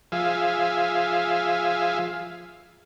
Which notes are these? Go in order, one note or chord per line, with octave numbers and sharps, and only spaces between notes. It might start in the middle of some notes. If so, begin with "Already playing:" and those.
F3 G#4 E5 F5